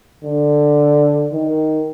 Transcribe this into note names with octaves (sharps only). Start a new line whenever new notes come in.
D3
D#3